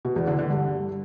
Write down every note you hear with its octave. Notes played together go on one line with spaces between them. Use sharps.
B2
E2
D3
D3
G2